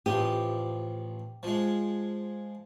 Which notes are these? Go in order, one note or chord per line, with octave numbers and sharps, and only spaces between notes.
A1 F3 G4 D#6
F3 G#3